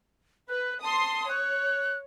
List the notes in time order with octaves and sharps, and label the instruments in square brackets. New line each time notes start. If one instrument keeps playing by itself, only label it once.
[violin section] B4 [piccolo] F#6
[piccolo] A5 [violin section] C6 D#6
[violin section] C#5 [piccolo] F#6